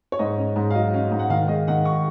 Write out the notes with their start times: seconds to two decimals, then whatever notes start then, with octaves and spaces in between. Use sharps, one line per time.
0.12 C#5
0.19 G#2 D#5
0.38 C#4
0.56 G#2
0.70 F5
0.75 F#3 D#5
0.94 C#4
1.11 G#2
1.19 F#5
1.30 D#3 F5
1.48 G#3 D#5
1.68 D#3 F#5
1.85 C#6